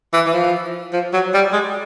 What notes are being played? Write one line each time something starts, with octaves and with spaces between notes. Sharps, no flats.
E3
E3
F3
F3
F#3
G3
G#3